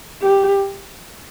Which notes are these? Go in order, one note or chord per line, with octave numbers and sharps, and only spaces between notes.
G4